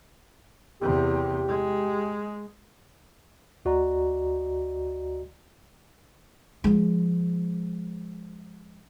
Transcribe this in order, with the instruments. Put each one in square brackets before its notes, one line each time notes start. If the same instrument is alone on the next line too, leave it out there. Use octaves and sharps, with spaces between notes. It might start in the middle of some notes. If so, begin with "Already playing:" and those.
[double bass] E2 C3 [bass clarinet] G4
[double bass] G#3
[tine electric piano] D2 F#4 D5 D#5 A#5
[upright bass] F3 G#3